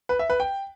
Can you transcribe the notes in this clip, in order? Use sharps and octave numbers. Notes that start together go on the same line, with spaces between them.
B4
E5
B4
G5